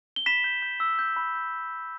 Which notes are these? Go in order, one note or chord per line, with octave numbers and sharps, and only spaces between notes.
G7
B5 B6 E7
G6
G6
E6
G6
B5
G6